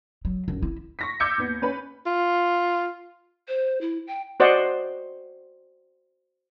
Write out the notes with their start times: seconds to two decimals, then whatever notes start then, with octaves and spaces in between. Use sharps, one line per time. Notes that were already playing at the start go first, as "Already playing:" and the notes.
0.25 F#3
0.48 F#2
0.63 E4
0.99 C#6 A#6 B6
1.20 D6 E6 G6 G#6 B6 C#7
1.37 D#2 B3
1.62 C#4 B4 B5
2.06 F4
3.48 C5
3.81 E4
4.07 G5
4.40 F#4 C5 D5 D#5 F#5